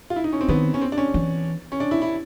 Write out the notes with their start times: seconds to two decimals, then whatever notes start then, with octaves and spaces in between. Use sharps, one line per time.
0.10 F4
0.16 E4
0.24 D#4
0.33 C#4
0.41 C4
0.49 D#3 B3
0.74 C#4
0.82 C4
0.92 D4
0.98 C#4
1.14 E3
1.72 C#4
1.80 D4
1.91 E4
2.02 E4